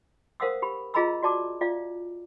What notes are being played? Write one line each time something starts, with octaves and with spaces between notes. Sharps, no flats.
A#4 C5 F5 F#5 D#6 E6
G4 B5
F4 G#4 D#5 A#5 B5 E6
F#4 D5 A5 D6
F4 D5 E5 F5